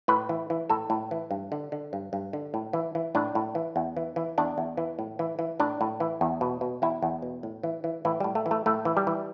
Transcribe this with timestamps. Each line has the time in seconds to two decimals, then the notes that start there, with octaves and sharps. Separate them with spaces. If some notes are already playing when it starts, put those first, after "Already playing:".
0.08 A2 B4
0.29 E3
0.50 E3
0.70 A2 A4
0.90 A2
1.11 E3
1.31 G2
1.52 D3
1.72 D3
1.93 G2
2.13 G2
2.33 D3
2.54 A2
2.73 E3
2.95 E3
3.15 A2 D4
3.35 A2
3.55 E3
3.76 E2
3.97 E3
4.16 E3
4.38 E2 D4
4.58 E2
4.77 E3
4.99 A2
5.19 E3
5.39 E3
5.60 A2 D4
5.81 A2
6.00 E3
6.21 E2
6.41 B2
6.61 B2
6.82 E2 E4
7.02 E2
7.22 B2
7.43 A2
7.63 E3
7.84 E3
8.05 A2 E3
8.20 A2 G3
8.35 A3
8.46 E3
8.51 A3
8.66 A2 A3
8.85 E3
8.97 G3
9.07 E3